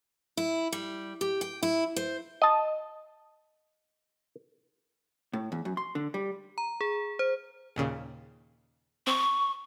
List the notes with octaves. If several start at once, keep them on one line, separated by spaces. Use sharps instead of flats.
E4
G3
G4
G5
E4
C5
D#5 A5
A2
E2
F#2
C6
D3
G3
A#5
G#4
C5
D#2 A#2 C#3
C4 C#6